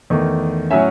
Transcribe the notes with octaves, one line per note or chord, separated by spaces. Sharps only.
E2 D#3 A3
A2 F#3 C#4 E5 G#5